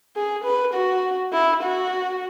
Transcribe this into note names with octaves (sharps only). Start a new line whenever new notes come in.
G#4
B4
F#4
E4
F#4